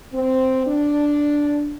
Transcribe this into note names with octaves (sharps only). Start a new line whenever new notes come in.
C4
D4